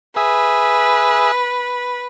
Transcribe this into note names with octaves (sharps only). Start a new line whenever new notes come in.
G#4 B4 E5